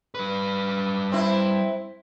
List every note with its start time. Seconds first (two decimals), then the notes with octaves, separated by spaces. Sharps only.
0.15 G3 B4
1.12 C4 E4